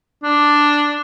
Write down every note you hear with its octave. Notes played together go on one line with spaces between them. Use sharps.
D4